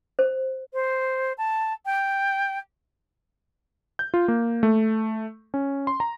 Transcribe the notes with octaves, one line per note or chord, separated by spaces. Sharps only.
C5
C5
A5
G5
G6
F4
A#3
A3
C#4
C6
A#5